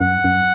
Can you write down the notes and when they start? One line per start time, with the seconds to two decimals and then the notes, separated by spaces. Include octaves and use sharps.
0.01 F#2 F#5
0.24 F#2